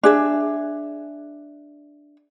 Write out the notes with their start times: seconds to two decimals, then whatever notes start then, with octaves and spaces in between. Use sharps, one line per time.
0.03 D4 G#4 E5